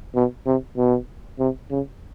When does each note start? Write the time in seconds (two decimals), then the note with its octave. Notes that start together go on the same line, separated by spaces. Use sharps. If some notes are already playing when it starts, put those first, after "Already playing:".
0.15 B2
0.46 C3
0.77 B2
1.39 C3
1.71 C#3